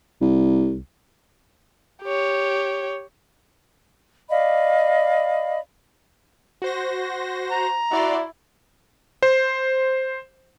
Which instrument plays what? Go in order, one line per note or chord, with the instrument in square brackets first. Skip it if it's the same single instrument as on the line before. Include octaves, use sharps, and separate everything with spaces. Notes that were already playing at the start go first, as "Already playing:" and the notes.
[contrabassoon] C2
[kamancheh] G4 C#5
[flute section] D5 D#5 F5 B5
[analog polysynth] F#4 C5 A#6
[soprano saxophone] A#5
[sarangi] E4 [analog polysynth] F#4 D5 C6
[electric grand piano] C5